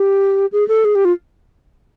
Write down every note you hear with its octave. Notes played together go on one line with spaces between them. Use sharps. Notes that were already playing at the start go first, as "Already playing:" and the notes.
Already playing: G4
G#4
A4
G#4
G4
F4